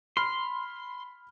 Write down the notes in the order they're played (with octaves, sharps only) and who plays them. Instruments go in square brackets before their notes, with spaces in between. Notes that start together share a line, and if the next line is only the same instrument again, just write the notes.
[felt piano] B5 F6 [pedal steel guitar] C6